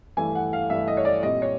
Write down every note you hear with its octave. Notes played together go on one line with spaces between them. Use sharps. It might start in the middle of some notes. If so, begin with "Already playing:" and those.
G2 E3 A3 G#5
F#5
F5
G2 E3 A3 E5
D#5
C#5
D5
A#2 G3 C4 D#5
C#5